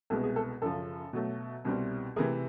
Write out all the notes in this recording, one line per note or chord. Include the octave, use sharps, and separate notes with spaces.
C2 B2 G#3 B3 A4
G#4
A4
F#2 C#3 F3 A4
B2 F#3 A3
C2 B2 G3 C4
C3 E3 A3 G#4 A#4